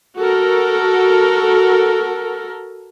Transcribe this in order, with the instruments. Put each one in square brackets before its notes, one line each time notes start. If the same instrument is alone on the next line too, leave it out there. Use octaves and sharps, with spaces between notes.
[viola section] F#4 A4 A#4